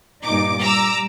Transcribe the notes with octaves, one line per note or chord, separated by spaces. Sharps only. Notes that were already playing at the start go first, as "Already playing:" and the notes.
G2 A#2 D#4 D6
G3 A#5 D6 E6